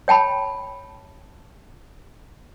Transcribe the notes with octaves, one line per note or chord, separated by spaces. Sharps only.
C#5 G5 A5 B5